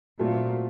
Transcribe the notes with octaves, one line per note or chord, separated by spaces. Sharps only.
A#2 F#3 A3 C4 F4